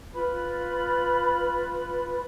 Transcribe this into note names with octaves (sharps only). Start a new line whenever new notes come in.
F4 B4 B5